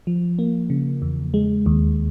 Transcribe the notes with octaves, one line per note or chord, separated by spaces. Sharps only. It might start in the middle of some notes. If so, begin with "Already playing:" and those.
F3
A#3
C#3
E2
G#3
D#2